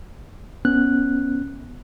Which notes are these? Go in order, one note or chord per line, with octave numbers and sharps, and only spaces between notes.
B3 C#4 F#6